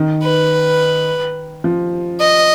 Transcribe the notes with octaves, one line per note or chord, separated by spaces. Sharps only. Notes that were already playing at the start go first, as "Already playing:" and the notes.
Already playing: D#3
B4
F3
D#5